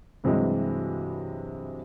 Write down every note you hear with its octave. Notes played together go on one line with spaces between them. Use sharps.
G2 C3 E3 F#3 G#3